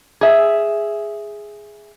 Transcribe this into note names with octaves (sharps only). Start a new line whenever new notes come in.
G#4 E5